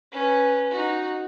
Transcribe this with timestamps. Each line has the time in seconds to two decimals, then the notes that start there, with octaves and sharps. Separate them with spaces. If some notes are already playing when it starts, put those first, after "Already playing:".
0.12 C#4 B4
0.71 D#4 F#4